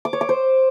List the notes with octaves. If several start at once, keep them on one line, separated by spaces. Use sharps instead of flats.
D6
C#5
D6
C5